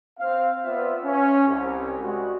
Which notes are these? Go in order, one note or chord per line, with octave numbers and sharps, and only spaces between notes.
C4 F5
B3 C4 F4 D5 E5
C#4
C2
G3 G#3 F#4